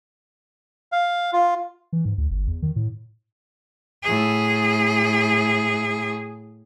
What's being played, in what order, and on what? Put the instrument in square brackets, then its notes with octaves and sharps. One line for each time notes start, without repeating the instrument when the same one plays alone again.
[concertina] F5
F4
[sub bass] E3
G#2
D2
G1
E2
D#3
A2
[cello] A2 G#4